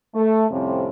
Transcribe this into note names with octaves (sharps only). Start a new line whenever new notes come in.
A3
F2 A2 C3 G3 C4 C#4